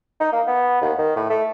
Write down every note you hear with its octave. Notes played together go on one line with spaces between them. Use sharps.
D#4
A#3
B3
D#2
D#3
A2
A3